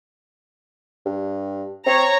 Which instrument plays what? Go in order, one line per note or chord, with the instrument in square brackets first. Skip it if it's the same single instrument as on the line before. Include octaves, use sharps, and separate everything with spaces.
[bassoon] G2
[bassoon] C4 [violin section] C#5 A#5